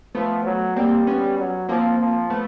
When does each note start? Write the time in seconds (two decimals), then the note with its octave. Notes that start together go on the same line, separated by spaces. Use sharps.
0.15 F3 A3 B3
0.45 F#3
0.76 G3 A#3 C4
1.07 B3 C#4
1.39 F#3
1.69 F3 A#3 C4
1.99 F3
2.30 A3 B3